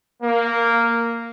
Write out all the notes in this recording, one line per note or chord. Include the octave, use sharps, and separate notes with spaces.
A#3